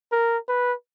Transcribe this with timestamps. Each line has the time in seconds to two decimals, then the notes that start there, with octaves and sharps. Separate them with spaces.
0.12 A#4
0.49 B4